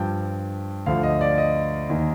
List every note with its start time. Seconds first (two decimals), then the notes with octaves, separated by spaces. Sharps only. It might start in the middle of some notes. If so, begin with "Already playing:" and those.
Already playing: G2 F3 G5
0.86 D2 D3 F3 F5
1.03 D#5
1.21 D5
1.38 D#5
1.89 D#2 D#3